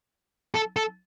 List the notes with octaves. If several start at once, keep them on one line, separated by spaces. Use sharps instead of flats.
A4
A4